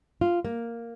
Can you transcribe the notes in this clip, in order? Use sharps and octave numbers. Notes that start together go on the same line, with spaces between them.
F4
A#3